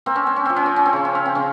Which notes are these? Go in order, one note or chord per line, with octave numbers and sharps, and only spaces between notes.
A#3 C4
C#4
C4
C#4
F3 C4
C#4
C4
C#4
C4
C#3 C#4
C4
C#4
C4
C#3 C#4